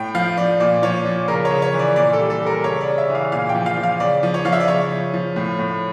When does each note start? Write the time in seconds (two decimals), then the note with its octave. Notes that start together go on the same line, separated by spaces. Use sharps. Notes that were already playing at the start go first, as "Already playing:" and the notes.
Already playing: A2 G5
0.15 F3 F5
0.37 F3 D5
0.60 A#2 D5
0.82 F3 C#5
1.05 F3
1.28 C#3 A#4
1.45 C#5
1.50 C#3
1.62 C#5
1.74 E3
1.79 D5
1.96 A#2 D5
2.13 A4
2.19 G3
2.30 A4
2.41 G3
2.46 A#4
2.64 C#3 C#5
2.81 D5
2.87 C#3
2.98 E5
3.09 E3
3.15 F5
3.32 A#2 F5
3.49 G5
3.55 F3
3.66 F5
3.77 F3
3.83 F5
4.00 C#3 D5
4.23 F3
4.34 C#5
4.45 F3 F5
4.52 E5
4.60 D5
4.68 C#3 C#5
4.91 F3
5.14 F3
5.36 A2
5.59 A2